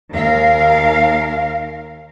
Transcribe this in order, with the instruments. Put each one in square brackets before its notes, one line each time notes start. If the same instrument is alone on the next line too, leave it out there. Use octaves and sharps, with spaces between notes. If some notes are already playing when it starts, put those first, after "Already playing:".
[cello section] D#2 A#4 F5